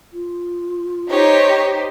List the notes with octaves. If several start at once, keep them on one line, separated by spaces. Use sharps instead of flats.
F4
D#4 G4 C5 C#5